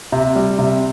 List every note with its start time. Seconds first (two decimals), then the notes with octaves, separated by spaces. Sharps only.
0.12 C3
0.35 G3
0.59 C3